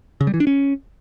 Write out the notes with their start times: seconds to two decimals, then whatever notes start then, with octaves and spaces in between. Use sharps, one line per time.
0.21 C#3
0.27 G3
0.34 E3
0.40 D4
0.47 C#4